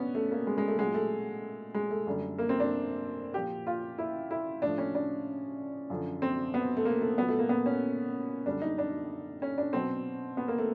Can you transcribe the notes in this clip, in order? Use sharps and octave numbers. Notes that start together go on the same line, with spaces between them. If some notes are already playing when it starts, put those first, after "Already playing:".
Already playing: A2 B3 C#4 D4
A3
A#3
G#3
G#3
A3
A#2 F#3 G#3
A3
G#3
A3
F#2 D3 G3
A#3
C4
D4
A#2 F3 G4
F4
E4
E4
A2 F3 D4
C#4
D4
F#2 D3 F3
C4
B3
A3
A#3
A3
A#2 F#3 B3
A3
A#3
B3
C#4
F#2 D3 G3 D4
D#4
D4
C#4
D4
B2 F#3 C4
B3
A#3
A3